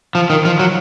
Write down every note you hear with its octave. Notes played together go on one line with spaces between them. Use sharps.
F3
D#3
F3
F#3